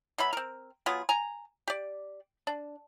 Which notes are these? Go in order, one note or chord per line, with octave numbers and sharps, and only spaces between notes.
B2 F#3 E5 B5
C4 A#4
F#3 B3 F4 G#4
G#5 A#5
G4 D5
D4